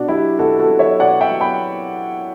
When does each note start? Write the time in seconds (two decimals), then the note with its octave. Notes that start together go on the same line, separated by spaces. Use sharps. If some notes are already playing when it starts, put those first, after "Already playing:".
Already playing: B2 D4 F#4
0.08 F#3 E4 G4
0.39 B2 F#4 A4
0.59 F#4 A4
0.69 F#3
0.79 C#5 E5
1.00 B2 D5 F#5
1.21 E5 G5
1.31 F#3
1.41 G5 B5